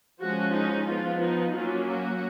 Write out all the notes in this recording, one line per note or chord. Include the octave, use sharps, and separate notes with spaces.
F3 G#3 C#4 F#4
D#4
F3 B3 F4
D#4
F#3 A#3 C#4 F4
F#4